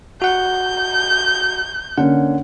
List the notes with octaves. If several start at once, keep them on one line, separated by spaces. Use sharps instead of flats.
F#4 F#5 G6
D3 A#3 C#4 F#5